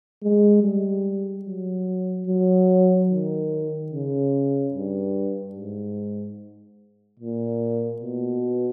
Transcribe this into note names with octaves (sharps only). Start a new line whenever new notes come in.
G#3
G3
F#3
F#3
D#3
C#3
G2
G#2
A#2
B2